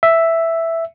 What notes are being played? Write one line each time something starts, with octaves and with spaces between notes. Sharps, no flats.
E5